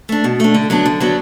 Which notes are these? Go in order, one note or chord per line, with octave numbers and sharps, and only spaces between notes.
A3 D4
B2
A3 D4
D3
F#3 B3 D4
D3
F#3 B3 D4